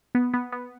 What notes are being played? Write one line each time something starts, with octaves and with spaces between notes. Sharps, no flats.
B3
B3
B3